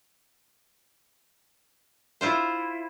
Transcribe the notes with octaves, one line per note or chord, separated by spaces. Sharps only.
E4 F4 C5